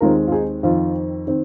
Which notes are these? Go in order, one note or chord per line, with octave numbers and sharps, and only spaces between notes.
D#2 D#3 G#3 C4 F4 A#4
F4
D#4 G#4
F2 D#3 C4 F4
D#3 C4